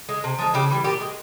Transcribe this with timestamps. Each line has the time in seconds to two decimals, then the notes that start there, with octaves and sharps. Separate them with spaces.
0.09 G#3
0.24 C3
0.38 F3 G#3
0.54 C#3 G4
0.70 E3 G3
0.84 A#2 G4
1.00 G#3